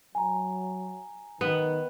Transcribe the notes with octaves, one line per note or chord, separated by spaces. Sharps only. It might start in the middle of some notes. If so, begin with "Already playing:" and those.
F#3 G#5 A#5
D#3 B3